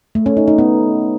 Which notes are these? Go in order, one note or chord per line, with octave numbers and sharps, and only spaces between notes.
A3
C#4
D#4
D#4
B3